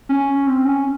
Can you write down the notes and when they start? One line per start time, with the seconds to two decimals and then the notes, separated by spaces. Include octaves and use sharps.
0.09 C#4
0.47 C4
0.65 C#4